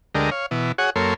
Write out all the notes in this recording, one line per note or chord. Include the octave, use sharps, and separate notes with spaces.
D2 D3 G#3 G4 A#4 D#5
C#5 F5
B2 E3
F#4 G#4 C#5 F#5
F#2 A#3 A4 C#5 C6